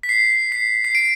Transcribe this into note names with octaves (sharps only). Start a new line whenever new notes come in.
B6
C7
C7
C7
D7